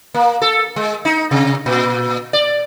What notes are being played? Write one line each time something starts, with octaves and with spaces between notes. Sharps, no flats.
A#3
A4
G#3
D#4
C3
A#2
D5